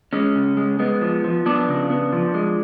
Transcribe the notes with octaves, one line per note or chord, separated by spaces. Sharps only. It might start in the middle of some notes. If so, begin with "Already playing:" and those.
G#3 C#4
C#3
G#3
G#3 B3
F3
F3
F3 B3 D4
C#3
B3
F3
G#3